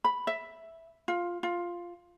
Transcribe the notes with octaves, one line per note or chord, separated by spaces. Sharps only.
B5
E5
F4
F4